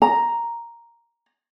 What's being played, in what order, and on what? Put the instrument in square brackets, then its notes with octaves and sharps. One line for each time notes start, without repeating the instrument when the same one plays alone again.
[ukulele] A#5